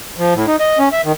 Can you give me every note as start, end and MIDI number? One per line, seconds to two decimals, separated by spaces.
0.18 0.34 53
0.34 0.46 45
0.47 0.56 63
0.60 0.79 75
0.79 0.89 61
0.93 1.01 76
1.04 1.12 51